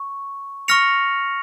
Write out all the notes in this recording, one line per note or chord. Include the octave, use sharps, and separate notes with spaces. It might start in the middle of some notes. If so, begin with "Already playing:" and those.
Already playing: C#6
C#6 F6 A#6 C#7 F7